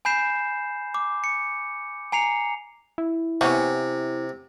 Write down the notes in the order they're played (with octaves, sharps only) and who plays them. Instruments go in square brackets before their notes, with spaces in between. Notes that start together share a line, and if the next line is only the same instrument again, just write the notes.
[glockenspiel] G#5 B5 G6 C7 E7
D6
C#7
G#5 A#5 C7 C#7 F7
[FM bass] E4
[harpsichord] C3 [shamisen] E3 B3 C#4